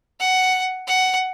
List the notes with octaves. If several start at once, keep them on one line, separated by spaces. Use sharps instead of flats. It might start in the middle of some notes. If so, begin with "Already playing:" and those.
F#5
F#5